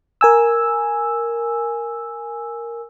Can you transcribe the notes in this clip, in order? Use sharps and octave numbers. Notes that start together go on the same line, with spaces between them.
A#4 G#5 E6